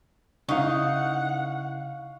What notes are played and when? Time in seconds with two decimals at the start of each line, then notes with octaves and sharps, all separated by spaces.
0.49 C#3 D#4 E4 F5 F#5 C#6